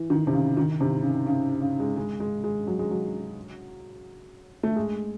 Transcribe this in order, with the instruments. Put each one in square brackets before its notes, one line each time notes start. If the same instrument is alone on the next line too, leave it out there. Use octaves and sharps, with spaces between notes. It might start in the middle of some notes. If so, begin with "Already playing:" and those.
Already playing: [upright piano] E3
D#3
C3
C#3
D#3
C3
C#3
C#3
C#3
G#3
G#3
G#3
G#3
F#3
G#3
F#3
A3
G#3